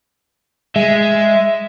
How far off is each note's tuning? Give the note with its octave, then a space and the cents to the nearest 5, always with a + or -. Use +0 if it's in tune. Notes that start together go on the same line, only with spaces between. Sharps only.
G#3 +0 E5 +0